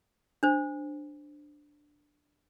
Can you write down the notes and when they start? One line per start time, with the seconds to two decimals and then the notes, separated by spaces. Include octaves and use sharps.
0.43 D4 C5